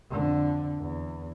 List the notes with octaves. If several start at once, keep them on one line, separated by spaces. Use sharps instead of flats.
F2 D3
E2